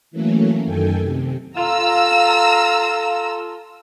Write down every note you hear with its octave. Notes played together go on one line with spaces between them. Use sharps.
E3 F#3 A3 A#3 C#4
F#2 D#3 A4 G5 G#5
C3
F4 A4 F5 A#5 E6